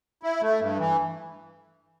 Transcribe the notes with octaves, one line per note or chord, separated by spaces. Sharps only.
E4
A3
G2
E3